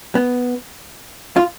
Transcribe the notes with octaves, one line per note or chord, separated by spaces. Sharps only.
B3
F4